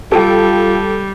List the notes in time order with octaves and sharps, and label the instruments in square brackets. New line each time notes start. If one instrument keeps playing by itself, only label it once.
[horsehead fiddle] G3 [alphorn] F4 [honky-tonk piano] A4 G5